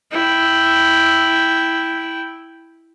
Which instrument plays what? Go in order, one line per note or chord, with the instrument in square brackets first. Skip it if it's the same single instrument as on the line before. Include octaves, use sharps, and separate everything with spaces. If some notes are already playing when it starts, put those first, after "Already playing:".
[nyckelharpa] E4 G5